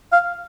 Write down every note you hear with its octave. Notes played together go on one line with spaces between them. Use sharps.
F5